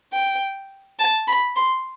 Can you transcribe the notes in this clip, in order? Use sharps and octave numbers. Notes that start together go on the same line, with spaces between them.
G5
A5
B5
C6